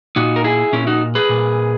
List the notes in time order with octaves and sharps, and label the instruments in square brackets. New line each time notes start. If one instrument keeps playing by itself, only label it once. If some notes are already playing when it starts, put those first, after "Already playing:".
[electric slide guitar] A#2 D#4 F#4
A#4
E4 G#4
A#2 C#4 E4
D#4 F#4
G#4 B4
A#2